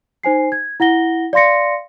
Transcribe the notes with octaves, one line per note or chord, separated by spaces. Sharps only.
D#4 C5 G#5 C7
G#6
E4 F#5 A#6 G7
D5 F5 C6 A#6 C#7